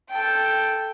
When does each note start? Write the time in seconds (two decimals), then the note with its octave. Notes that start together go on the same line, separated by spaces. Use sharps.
0.11 A4 G5